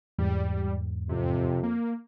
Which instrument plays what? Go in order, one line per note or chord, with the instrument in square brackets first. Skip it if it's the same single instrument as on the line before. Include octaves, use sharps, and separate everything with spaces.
[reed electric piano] E2 G#2 [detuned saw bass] G3
[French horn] F2 [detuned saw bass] C3
[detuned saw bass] A#3